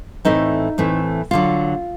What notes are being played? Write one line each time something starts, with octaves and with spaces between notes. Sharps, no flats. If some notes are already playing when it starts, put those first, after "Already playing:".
A2 E3 A3 C4 D#4
A2 E3 A3 C4
D3 F#3 F4